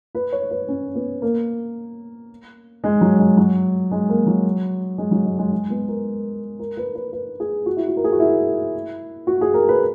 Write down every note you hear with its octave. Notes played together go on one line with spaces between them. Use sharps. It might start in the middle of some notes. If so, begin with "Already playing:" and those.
B4
C#5
B4
C#4
B3
A#3
G#3
F#3
G#3
F#3
G#3
A#3
F#3
G#3
F#3
G#3
G#3
G#3
B3
A#4
A#4
B4
B4
B4
G#4
F#4
E4
F#4
A#4
G#4
F#4
E4
F#4
G#4
A#4
B4